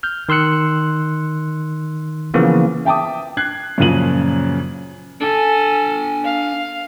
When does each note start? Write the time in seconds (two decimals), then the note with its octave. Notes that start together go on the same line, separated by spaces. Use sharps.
0.03 F6 G6
0.29 D#3 C6 E6 F#6 C#7
2.34 C#3 E3 F3 A#3 B3
2.85 E5 G5 A5 D6 D#6
3.37 F#6 G#6 C7
3.78 F#2 A#2 C#3 F3 D#7 F#7
5.21 D4 A4 G#5
6.25 F5